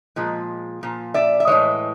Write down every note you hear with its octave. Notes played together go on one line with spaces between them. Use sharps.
A#2 F3 G#3
A#2 F3
D5 E5
E5
A2 E3 G#3 C#5 D#5